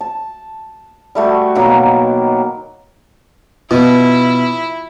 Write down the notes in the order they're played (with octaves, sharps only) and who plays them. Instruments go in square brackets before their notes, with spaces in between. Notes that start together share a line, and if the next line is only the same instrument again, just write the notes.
[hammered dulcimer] A5
G3 A3 F#4
B2 D#3 F#3 A#3
[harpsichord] B2 [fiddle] E4 [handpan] F4